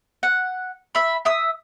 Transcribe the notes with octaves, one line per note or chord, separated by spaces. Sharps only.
F#5
E5 B5
E5 D#6 E6